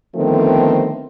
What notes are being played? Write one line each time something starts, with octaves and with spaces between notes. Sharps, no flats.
D3 D#3 F3 A3 B3 C4